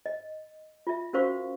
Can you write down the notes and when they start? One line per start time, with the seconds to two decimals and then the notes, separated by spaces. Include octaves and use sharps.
0.06 D#5
0.87 F4 E5
1.13 C#4 F#4 A#4 C5 F5 C#6